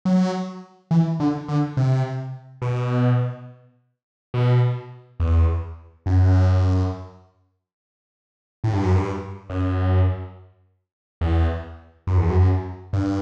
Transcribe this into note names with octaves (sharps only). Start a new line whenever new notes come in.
F#3
E3
D3
D3
C3
B2
B2
E2
F#2
A2
G2
F#2
G2
F#2
E2
F#2
E2
F#2
G2